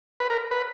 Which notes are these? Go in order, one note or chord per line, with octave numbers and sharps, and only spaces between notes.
B4
A#4
B4